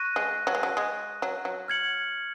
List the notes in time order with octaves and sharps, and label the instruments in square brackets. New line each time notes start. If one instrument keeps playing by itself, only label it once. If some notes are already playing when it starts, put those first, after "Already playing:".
Already playing: [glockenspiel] C#6 F#6 A#6 D#7
[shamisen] G#3
F#3
G#3
F#3
G#3
F#3
F#3
[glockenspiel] F6 G#6 C#7 F#7